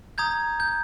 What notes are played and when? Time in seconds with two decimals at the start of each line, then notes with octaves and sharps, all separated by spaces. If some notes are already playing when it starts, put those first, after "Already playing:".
0.18 A#5 D#6 G6 G#6
0.60 G6